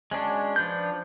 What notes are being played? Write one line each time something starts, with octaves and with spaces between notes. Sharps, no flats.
G#3 C#4 D4 F#4
F3 D4 B4 G6